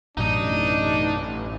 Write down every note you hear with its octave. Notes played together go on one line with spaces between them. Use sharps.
A1 F#2 B2 F#3 D4 D#4 D#5